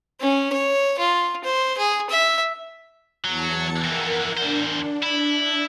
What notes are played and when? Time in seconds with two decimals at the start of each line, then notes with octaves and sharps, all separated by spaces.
0.20 C#4
0.52 C#5
0.99 F4
1.44 C5
1.78 G#4
2.10 E5
3.24 E2 F#3 A5 C#7
3.85 F2 E3 A#4 F#5
4.37 E2 D4 C5
5.03 E4